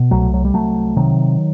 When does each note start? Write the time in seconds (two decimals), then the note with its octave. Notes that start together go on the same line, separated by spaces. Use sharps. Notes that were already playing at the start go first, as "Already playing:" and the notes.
Already playing: B2
0.11 C2 F#3 A3
0.34 F#3
0.45 G3
0.54 C2 F#3 A3
0.96 C3 D#3 F#3